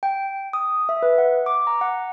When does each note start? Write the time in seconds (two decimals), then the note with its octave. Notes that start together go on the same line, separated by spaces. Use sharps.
0.03 G5
0.53 D#6
0.89 E5
1.03 B4
1.18 F#5
1.46 D6
1.67 A#5
1.81 F#5